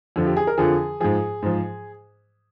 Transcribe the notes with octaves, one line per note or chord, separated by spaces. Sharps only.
F2 D3 F3
G4
G#4
A#4
F2 D3 F3 G#4
G#2 F3 G#4
G#2 F3